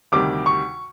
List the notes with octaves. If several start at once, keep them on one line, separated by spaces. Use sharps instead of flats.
D2 C3 D#3 G3 D6
C#6